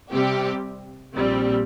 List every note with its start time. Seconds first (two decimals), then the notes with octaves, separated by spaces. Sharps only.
0.12 C3 G3 C4 G4
1.14 A#1 A#2 G3 C4